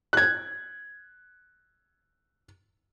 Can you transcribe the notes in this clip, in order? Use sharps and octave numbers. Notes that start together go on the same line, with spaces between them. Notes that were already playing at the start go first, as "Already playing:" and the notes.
F#6 G#6